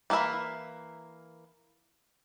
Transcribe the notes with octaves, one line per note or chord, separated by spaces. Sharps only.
E3 A#3 F#4 E5 B5